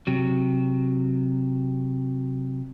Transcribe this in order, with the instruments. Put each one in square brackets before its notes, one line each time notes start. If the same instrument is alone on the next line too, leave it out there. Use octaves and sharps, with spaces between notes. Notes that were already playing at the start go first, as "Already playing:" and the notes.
[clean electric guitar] C3 F#3